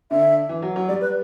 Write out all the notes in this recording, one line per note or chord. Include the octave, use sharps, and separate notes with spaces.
D3 E5
E3
F#3
F#3
G3 D5
B4